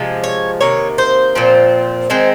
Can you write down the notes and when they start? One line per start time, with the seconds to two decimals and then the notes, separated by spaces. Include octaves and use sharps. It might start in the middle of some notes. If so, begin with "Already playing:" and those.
Already playing: C3 F3 G#3
0.24 C#5
0.61 C3 D#3 A#3 C#5
0.98 C5
1.35 A#2 F3 C4
2.10 D#3 G#3 C4